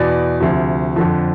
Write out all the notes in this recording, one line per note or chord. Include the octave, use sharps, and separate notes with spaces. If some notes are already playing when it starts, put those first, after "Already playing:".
Already playing: E2 B2 D5
D2 C3 F3
F2 D3 F3